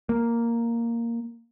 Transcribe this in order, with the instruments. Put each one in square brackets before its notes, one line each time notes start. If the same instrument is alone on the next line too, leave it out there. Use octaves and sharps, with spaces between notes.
[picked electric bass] A#3